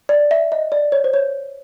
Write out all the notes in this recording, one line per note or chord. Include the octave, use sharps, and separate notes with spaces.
D5
E5
D#5
D5
C#5
C5
C#5